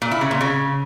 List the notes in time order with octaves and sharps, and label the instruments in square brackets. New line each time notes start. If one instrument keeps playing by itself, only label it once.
[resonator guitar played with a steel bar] A#2
E4
C#3
A#2
C#3